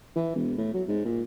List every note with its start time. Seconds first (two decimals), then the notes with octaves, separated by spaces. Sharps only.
0.16 E3
0.35 E1
0.58 A2
0.74 F#3
0.88 G#2
1.05 A#2